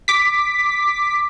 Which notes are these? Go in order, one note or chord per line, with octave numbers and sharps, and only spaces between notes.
D6 B6